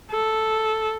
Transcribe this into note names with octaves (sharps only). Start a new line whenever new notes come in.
A4